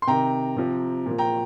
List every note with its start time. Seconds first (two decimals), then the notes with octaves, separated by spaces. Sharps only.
0.02 C6
0.07 C3 D#3 G5 A#5
0.57 C3 F3
1.06 A#2 F3
1.19 G5 A#5